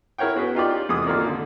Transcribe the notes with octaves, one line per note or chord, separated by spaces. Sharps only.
E4 G#4 A#4 C#5 F#5 G5
B3 F#4 G#4 B4
D#4 F4 G4 D5
E2 C3 G#3 D#6
G#1 A#3 F4 A#4 D5
D3